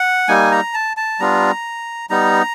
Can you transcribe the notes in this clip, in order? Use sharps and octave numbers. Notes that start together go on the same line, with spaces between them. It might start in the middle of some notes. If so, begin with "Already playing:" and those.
Already playing: F#5
G3 A#3 D#4 G#5
A#5
A5
A5
G3 B3 D4 F4 A#5
G3 B3 D#4 A#5